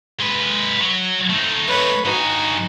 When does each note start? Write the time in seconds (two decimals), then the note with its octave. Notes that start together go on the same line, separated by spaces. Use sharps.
0.20 G#3 B4
0.80 F#3
1.30 A3 D#4
1.67 B4 C#5
2.05 G2 D#4 F#4 G#5